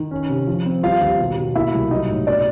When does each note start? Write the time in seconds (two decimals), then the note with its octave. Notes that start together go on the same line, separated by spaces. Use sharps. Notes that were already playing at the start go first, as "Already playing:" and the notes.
Already playing: D#3
0.11 C#4
0.29 C3
0.47 F3
0.66 C4
0.83 G3 F4 F5
1.01 D#2
1.19 B2
1.37 B2
1.55 A#3 E4 E5
1.74 C2
1.91 F#3 D#4 D#5
2.09 A2
2.27 B2 D4 D5